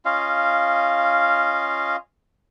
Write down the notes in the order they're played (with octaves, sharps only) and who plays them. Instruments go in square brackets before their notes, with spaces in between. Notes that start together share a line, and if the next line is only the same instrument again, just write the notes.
[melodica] C#4 F4 D#5 F5